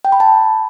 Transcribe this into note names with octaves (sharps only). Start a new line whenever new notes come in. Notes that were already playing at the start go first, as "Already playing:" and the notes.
G5
B5
A5